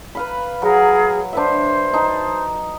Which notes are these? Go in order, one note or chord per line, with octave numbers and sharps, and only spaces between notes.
B4 F5 B5
F#3 G#4 A#4
D4 B4 C5 E5
D#4 A5